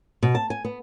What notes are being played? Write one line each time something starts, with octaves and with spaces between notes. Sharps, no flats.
B2
A5
G#5
B3